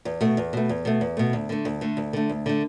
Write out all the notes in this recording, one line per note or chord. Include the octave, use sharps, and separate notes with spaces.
E2
B2 A3
E2
B2 A3
E2
B2 A3
E2
B2 A3
D2
D3 A3
D2
D3 A3
D2
D3 A3
D2
D3 A3